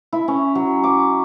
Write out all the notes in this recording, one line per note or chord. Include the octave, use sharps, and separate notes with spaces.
E4
C#4
F#3
D6